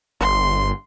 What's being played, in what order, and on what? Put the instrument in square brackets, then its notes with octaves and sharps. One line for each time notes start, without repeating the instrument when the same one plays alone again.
[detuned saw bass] G1 [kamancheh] C6